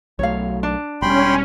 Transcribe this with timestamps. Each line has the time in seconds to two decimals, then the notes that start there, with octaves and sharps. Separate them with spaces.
0.19 B1 F#3 A3 C#5 F5
0.63 D4
1.02 E1 G3 C#4 G5 B5 C6